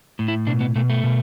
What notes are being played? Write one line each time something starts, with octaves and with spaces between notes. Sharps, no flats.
A2
E4
B2 D4
B3
B2 A3
A3
B2